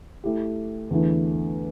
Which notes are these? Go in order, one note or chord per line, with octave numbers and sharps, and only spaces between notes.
A3 E4 G4
E2 D3 A3 E4